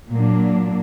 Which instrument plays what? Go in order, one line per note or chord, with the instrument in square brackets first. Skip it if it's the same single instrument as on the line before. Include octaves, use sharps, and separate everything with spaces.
[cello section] A#2 F#3 A#3 D4